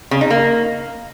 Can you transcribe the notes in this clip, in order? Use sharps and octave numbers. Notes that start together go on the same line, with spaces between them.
C#3
D#4
A#3